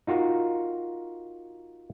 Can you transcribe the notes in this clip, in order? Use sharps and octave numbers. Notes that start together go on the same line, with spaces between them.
D#4 F4 F#4 A#4